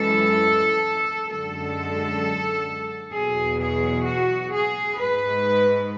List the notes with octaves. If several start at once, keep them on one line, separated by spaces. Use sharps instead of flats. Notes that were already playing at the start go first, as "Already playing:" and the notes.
Already playing: F#2 E3 G#3 A4
F#2 D3 G#3 A4
E2 B2 F#3 G#4
G#4
F#4
G#4
G#2 G#3 B4